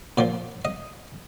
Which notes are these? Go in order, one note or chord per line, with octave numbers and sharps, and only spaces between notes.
A#2 F3 D5
D#5